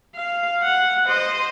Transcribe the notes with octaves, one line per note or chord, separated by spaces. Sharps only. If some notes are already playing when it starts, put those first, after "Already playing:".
F5
F#5
C5 D#5